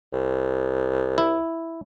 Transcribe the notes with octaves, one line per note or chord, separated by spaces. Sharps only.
C2
E4